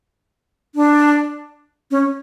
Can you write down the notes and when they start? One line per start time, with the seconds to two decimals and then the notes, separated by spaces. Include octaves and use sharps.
0.75 D4
1.91 C#4